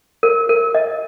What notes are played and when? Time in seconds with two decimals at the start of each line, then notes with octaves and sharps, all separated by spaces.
0.23 A#4
0.49 A#4
0.75 D#5